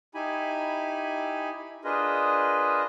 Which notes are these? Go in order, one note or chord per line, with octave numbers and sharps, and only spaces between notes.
D#4 E4 G4 G#5 B5
D4 F4 G#4 A#4 B4 D#5